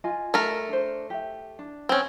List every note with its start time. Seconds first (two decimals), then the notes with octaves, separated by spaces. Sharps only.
0.04 F4 D#5 G#5
0.34 A3 A#4
0.69 D4 C5
1.10 G4 E5
1.59 D4
1.89 C4 C#4